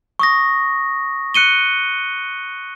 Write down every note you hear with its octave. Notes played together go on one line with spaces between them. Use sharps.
C#6 D#6 A#6
F#6 C#7 D#7 G7